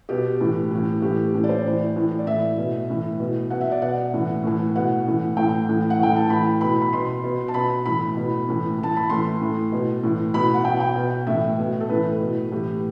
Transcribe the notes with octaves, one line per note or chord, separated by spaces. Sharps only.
B2 G4
A2 E3
A2 E3
A2 E3 G4
A2 E3
D5
C5
A2 E3
A2 E3
D5
A2 E3 E5
B2
A2 E3
B2
B2 F#5
E5
D5
B2 F#5
A2 E3
A2 E3
B2 F#5
A2 E3
A2 E3 G5
A2 E3
F#5
A2 E3 G5
A5
A2 E3 B5
B2 B5
B5
B2 C6
B2
A5
B2 B5
A2 E3 B5
B2
A2 E3
E3
A2 A5
B5
A2 E3 C6
A2 E3
B2
A2 E3
B2 B5
F#5
B2 G5
G5
B2
A2 E3 E5
B2
A4
A2 E3 B4
B2
A2 E3 G4